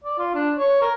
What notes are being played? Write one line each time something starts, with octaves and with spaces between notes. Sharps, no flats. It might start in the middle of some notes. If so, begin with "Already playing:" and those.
D5
F4
D4
C#5
A#4